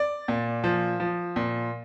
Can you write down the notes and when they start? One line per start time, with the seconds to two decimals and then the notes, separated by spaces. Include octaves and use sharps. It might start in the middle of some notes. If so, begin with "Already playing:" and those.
Already playing: D5
0.28 A#2
0.64 F3
1.00 F3
1.36 A#2